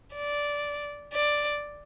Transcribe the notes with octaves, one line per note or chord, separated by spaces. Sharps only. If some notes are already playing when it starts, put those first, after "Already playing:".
D5
D5